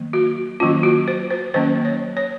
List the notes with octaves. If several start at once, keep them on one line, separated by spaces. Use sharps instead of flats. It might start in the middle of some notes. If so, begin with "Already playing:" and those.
Already playing: D#3 F#3 A#3
F#4
D#3 F#3 A#3 C#4 F4
F#4
C5
C5
D#3 F#3 A#3 C#4 C5
C#5
C#5